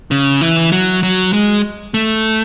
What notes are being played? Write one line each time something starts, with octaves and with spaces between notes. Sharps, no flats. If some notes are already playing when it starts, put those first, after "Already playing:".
C#3
E3
F#3
F#3
G#3
A3